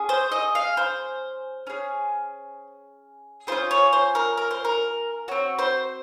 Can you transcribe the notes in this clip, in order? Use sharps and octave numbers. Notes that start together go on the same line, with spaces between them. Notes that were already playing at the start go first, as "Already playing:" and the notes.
Already playing: C#4 G#4
C5
D#5
F5
C5
C#4 G#4
C#4 F4 G#4 C5
C#5
C5
A#4
A#4
C5
A#4
C4 F#4 C#5
C5